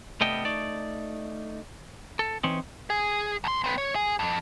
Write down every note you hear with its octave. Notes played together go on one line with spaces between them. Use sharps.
C2 G3 A3 B3 D#5 G5
A3 D#4 D5
A4
E3 C4 C#4 D#4
G#4
B1 C6
C4 B4
C#5
G#4
F2